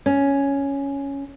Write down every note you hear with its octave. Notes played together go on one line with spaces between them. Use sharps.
C#4